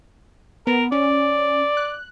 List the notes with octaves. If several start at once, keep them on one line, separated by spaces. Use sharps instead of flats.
B3 A#4
C#4 D5
F#6